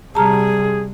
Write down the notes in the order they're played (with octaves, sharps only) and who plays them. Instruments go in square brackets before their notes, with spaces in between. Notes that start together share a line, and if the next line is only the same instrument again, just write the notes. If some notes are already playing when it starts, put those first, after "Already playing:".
[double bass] C3 G3 [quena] G#4 [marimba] A5 A#5 F6